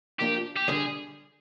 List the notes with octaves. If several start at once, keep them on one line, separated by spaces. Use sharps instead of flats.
F3 A#3 D4 F4 G4
G4
D3 G3 G#4